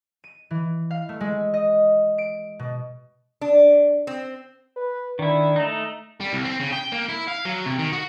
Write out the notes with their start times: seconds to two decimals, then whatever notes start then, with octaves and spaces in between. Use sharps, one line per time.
0.24 D#7
0.51 E3
0.91 F5
1.09 A3
1.21 G#3
1.54 D#5
2.18 D7
2.59 B2
3.41 D4
4.07 C4
4.76 B4
5.19 D#3 D4 E4
5.56 A3 D#4
6.20 G3
6.33 C2
6.44 C4
6.60 C#3
6.72 G5
6.92 A#3
7.09 E4
7.28 F5
7.45 F#3
7.66 C3
7.79 D#3
7.93 F#4